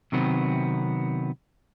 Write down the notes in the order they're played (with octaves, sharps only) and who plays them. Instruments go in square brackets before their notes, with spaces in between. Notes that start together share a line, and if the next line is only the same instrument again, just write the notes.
[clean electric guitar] C3 D#3 F#3 B3 C4